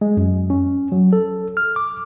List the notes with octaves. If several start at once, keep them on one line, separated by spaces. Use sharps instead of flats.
G#3
F#2
C#4
F#3
A4
F6
D6